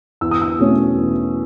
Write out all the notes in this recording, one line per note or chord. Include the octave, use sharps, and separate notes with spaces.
E2 E6
D#6
E6
B2 A3 C#4
E2